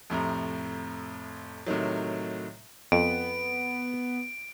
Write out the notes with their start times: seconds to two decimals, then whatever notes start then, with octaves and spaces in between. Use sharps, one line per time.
0.10 F2 A2 C3 A#5
1.66 A2 C3 D#3 F#3
2.92 F2 B3 D7